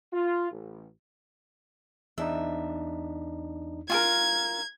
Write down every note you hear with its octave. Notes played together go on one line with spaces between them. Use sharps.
F4
A1
E2 D4 D#4 E5
F4 G#4 A#4 G#6